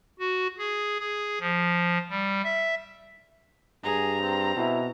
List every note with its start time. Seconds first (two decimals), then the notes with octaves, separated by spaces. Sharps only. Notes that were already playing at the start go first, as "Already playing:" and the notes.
0.19 F#4
0.58 G#4
1.00 G#4
1.41 F3
2.10 G3
2.44 E5
3.84 G2 G#4 A#5
4.21 C4
4.56 B2 E4